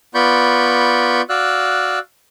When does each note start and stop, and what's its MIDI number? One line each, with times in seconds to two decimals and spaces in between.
0.15 1.22 59
0.15 1.22 65
0.15 1.22 74
0.15 1.22 83
0.15 1.22 85
0.15 1.22 91
1.29 1.99 66
1.29 1.99 74
1.29 1.99 77
1.29 1.99 88
1.29 1.99 90